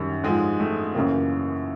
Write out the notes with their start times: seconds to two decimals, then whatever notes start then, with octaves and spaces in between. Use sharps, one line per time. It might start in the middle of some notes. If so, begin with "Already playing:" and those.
Already playing: F#2 D#3 G3
0.23 G#2 F3 G#3
0.60 A3
0.95 F#2 C#3 E3 A#3